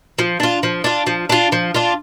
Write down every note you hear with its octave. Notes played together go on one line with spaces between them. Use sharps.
F3
D4 F4
F3
D4 F4
F3
D4 F4
F3
D4 F4